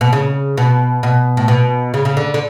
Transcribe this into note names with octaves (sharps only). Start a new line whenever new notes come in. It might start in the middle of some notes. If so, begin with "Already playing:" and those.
B2
C#3
B2
B2
A2
B2
C#3
C#3
D3
D3